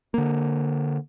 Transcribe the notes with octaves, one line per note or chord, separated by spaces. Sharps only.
D3 A#3